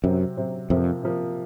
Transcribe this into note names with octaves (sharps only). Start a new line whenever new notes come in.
F#2 C3 F#3 C4
C3 F#3 C4
F2 C3 F3 A#3
C3 F3 A#3